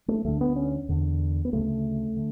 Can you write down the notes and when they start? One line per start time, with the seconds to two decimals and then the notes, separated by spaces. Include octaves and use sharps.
0.08 A3
0.25 D2 D3 A3
0.41 B3
0.56 C#4
0.89 E2 D3
1.45 B3
1.52 D2 C#3 A3
2.16 D3